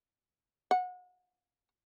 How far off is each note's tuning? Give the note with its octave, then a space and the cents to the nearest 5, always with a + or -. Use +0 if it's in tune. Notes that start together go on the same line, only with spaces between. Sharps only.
F#5 -30